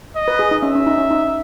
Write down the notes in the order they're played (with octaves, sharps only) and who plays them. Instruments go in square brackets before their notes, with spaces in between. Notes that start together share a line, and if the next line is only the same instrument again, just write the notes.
[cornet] D#5
[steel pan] B4
G#4
D#4
[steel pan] C#4 [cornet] E5
[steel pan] C#4
D#4
C#4
D#4